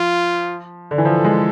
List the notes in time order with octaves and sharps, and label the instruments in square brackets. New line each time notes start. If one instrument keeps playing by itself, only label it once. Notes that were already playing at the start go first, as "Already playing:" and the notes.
Already playing: [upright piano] F3 [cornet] F4
[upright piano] D3
E3
[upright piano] F3 [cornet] A4
[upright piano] G#3